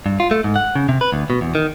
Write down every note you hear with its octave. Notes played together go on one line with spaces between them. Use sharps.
G2
F4
A3
G#2
F#5
C#3
C3
B4
D2
B2
E2
D#3